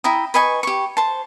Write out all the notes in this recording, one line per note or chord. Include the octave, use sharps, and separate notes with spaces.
E4 G5 A#5 D#6
B4 D#5 G#5 C#6
G4 C#6
C5 A5